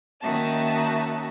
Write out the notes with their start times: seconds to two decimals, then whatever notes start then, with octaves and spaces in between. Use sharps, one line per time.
0.21 D#3 A#3 C#4 F#4 E5 A5